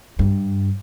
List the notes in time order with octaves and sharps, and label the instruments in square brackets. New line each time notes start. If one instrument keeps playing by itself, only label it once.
[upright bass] G2